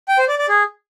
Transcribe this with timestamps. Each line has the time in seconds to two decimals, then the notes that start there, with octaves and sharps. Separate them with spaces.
0.08 G5
0.18 C5
0.29 D5
0.39 D5
0.49 G#4